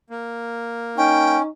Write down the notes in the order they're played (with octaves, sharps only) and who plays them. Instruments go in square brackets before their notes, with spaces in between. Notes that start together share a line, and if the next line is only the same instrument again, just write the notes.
[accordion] A#3
[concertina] C#4 [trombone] D#4 [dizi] G5